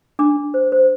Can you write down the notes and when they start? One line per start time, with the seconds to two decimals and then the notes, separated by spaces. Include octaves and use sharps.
0.19 D4 D6
0.36 D4
0.54 C5
0.72 C5